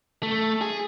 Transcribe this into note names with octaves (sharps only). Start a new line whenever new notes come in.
A3
G#4